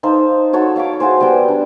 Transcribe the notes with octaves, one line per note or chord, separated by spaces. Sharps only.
D#4 A4 C5 F5
F#4 A4 C#5 E6
C#5 F5 B5 D6
E4 F#4 G#4 C5
G3 B3 G4 G5
D4